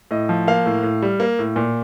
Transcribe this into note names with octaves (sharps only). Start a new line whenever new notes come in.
A2 D#5
F3
A#3 F5
A2
A2
G3
A#3
A2
A#2